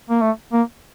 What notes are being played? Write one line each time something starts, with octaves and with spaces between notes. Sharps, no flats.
A#3
A3
A#3